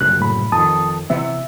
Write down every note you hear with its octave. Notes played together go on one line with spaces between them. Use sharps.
F#1 C2 F#6
A2 B5
F2 D#3 A5 D#6
C3 E3 B3 E5